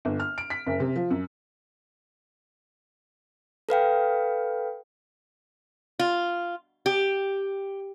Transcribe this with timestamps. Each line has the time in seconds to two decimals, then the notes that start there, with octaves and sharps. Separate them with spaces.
0.05 G1
0.20 F6
0.38 D7
0.50 B6
0.67 F#1
0.80 C3
0.96 F3
1.11 F#2
3.69 A4 B4 F5 G5
5.99 F4
6.86 G4